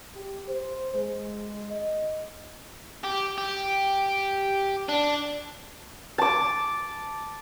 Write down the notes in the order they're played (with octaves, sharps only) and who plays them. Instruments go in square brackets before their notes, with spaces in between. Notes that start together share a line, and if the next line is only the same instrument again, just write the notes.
[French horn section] G4
C5
G#3
D#5
[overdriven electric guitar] G4
G4
D4
[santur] A5 D6